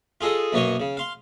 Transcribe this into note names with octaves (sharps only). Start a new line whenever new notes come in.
F4 G#4 A4 D#5
F#2 B2 A#3 C#5 D#5
C#3
F5 C6